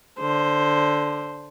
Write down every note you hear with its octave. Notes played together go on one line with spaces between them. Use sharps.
D3 C5